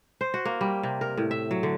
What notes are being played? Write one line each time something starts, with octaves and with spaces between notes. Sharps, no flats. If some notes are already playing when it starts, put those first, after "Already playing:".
C5
F#4
A#3
G3
C3
A#4
A2
E5
F#3
D3